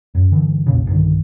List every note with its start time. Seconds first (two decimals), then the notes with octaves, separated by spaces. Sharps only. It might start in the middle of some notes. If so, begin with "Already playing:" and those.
0.15 F#2
0.32 G2 D3 E3
0.66 B1 E2 A#2 C#3
0.86 B1 G2 D3 D#3